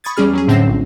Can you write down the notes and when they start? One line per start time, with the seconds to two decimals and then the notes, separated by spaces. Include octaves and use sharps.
0.04 B5 C#6 D#6 G#6 A6
0.17 E2 G3 C#4 G#4 F6
0.33 F#3 C#4 G#4
0.48 A2 D3 C4 A#6 C7 E7
0.68 A#1